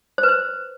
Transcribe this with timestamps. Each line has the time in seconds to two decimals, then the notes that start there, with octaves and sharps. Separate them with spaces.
0.18 C5
0.23 B4
0.29 C5